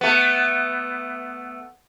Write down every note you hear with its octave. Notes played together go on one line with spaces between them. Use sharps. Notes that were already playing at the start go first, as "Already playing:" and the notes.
A3 B3